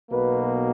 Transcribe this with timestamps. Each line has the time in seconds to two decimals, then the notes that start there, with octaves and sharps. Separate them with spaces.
0.10 B1 B2 A#3 B4